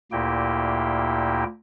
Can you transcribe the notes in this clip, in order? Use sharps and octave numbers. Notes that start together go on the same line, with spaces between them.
D2 A#2 A#3 E4 G4 G5